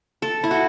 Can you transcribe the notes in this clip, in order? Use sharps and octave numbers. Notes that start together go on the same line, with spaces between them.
A4
E4
F#4